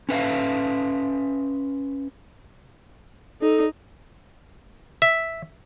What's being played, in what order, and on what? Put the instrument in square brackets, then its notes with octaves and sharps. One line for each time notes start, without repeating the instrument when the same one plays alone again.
[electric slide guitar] C#4 B4 E5 F5
[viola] D#4 [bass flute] A4
[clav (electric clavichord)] E5